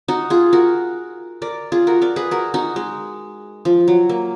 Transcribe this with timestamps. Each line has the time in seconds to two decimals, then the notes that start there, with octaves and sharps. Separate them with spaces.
0.08 D#4 F#4
0.30 F4 G#4
0.53 F#4 A#4
1.42 A#4 D5
1.72 F4 G#4
1.87 F#4 A#4
2.02 A#4 D5
2.16 G#4 B4
2.31 F#4 A#4
2.54 D#4 F#4
2.76 G#3
3.65 F3
3.88 F#3
4.09 A#3